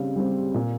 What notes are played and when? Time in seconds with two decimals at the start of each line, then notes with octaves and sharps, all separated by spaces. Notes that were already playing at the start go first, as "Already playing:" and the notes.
Already playing: C#3 G3 C4 F5
0.16 G3 C4
0.54 A#2